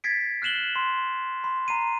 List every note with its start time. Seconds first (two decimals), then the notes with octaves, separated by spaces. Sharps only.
0.04 G#6 A6 B6 C7 D7
0.42 F6 F#6 C7 E7 F#7 G7
0.76 C6
1.44 B5 C6
1.68 A#5 C7 D#7